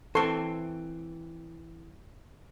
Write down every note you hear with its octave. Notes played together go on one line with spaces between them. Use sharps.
E3 C4 A4 C6 C#6